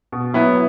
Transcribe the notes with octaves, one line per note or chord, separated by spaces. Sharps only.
B2
F#3 B3 E4